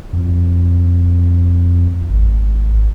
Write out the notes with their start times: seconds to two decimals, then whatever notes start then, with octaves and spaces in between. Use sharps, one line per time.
0.13 F2
2.09 G#1